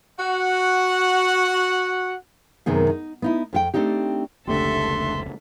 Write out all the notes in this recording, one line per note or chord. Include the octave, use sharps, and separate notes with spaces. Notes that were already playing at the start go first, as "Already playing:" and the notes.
F#4 F#5
F#2 C3 D#3 B3 G#4
D#4
B3 D#4 E4
F2 G4 G5
A3 C4 D4 D#4 G4
F1 C#2 D3 A3 G4 A4 E5 C6